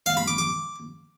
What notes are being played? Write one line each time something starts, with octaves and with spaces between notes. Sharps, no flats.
F5
B5
D6
D6